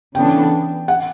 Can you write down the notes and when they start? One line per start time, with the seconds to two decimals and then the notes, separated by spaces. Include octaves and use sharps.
0.15 C#3 E3 B3 D4 A4 G5
0.88 F#5